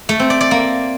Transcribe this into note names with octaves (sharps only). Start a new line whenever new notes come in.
A3
C4
D5
D5
A#3